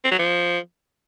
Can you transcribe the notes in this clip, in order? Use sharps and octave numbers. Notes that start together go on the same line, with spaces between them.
C4
F#3
F3